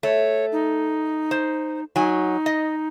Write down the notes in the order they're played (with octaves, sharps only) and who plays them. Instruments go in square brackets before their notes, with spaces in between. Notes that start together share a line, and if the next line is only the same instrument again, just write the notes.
[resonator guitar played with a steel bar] A3 [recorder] C#5
[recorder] D#4
[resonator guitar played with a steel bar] C5
[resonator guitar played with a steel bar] F#3 G#5 [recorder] D#4
[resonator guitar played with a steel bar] D#5